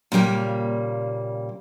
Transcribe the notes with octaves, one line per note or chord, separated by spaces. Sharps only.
A#2 C#3 G3 A#3